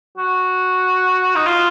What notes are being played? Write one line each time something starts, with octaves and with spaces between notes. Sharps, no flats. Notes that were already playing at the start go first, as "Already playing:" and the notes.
F#4
D#4
F4